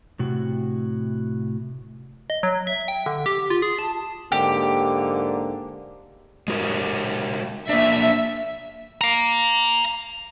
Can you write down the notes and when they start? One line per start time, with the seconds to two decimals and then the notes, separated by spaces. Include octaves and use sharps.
0.19 A2 C3 F#4
2.30 D#5
2.43 F#3
2.67 E5
2.88 G5
3.06 D3
3.26 G4
3.50 F4
3.62 G#4
3.79 A5
4.32 G#2 D3 A#3 G4
6.48 G#3 F#4 A#4
7.69 A#3 D4 E5
9.01 F5 A#5